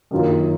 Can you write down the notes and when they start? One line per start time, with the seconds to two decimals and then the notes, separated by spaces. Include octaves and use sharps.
0.11 F#2 D#3 A#3 F4